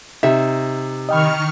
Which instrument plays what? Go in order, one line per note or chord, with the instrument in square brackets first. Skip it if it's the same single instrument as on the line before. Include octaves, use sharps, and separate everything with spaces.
[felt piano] C3 D#4 [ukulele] E5
[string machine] D#3 C#6 F6 [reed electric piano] D#5 G5 B5